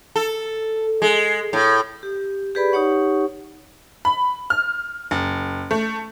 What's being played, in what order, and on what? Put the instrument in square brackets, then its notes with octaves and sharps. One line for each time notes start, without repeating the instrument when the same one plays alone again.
[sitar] A4
G#3
A2
[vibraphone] G4
G4 G#4 B4 D5 B5
D#4 G4 C#5 F#5 C#6
[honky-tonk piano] B5
F6
F#1
A3